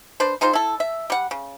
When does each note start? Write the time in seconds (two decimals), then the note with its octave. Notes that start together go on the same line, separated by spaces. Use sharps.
0.20 D4 B4 C5
0.41 G#3 D#4 F4 C5
0.53 E4 A4
0.80 E5
1.10 G3 F#5
1.31 C#3